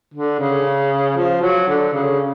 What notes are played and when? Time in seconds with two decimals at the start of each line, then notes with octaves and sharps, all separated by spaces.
0.14 D3
0.39 C#3
1.16 F3
1.42 F#3
1.68 D3
1.94 C#3